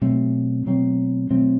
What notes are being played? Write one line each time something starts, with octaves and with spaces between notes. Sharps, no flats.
B2 F#3 A3 C4
B2 F#3 A3 C4
B2 F#3 A3 C4